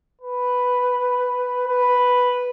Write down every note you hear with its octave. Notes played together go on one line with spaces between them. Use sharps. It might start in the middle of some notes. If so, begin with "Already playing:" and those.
B4
B4